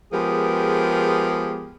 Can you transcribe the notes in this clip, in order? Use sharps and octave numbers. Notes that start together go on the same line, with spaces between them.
F3 G#3 B3 G4 G#4 A#4